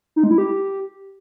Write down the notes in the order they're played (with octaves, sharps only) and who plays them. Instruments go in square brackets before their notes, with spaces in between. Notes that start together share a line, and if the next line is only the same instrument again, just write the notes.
[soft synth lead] D#4
G#3
E4
G4